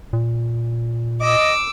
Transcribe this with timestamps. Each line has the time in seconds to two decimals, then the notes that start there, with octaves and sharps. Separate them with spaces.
0.13 A#2
1.20 D#5 D6 E6